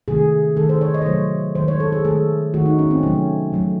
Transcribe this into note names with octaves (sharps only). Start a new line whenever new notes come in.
C3 D#3 A3 G#4
D#3 A3 A4
C5
C#5
D#5
C5
C3 F#3 A3 C#5
D#3 G#3 C5
C#5
A4
G#4
D#3 A3 A4
D#3 A3 F#4
D#4
C#4
C4
C3 F#3 A3 C#4
C#3 F#3 A3